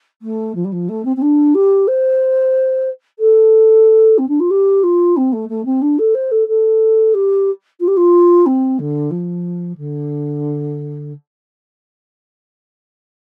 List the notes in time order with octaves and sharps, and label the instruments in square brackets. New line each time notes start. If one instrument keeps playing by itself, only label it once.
[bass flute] A3
F3
G3
F3
A3
C4
C4
D4
G4
C5
A4
C4
D4
F4
G4
F4
C4
A3
A3
C4
D4
A4
C5
A4
A4
G4
F4
G4
F4
C4
D3
F3
D3